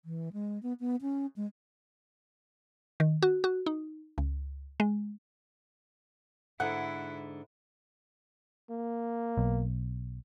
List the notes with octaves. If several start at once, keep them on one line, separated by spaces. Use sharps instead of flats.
E3
G#3
B3
B3
C#4
G#3
D#3
F#4
F#4
D#4
C#2
G#3
G#2 D3 E4 F#5
A#3
B1